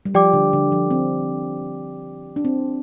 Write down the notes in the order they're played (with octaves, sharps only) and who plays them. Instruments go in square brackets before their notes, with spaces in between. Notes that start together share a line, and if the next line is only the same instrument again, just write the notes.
[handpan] G3
[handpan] F3 [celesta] G4 D5 G5 D6
[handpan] D3
D3
F3
C4
D4
C4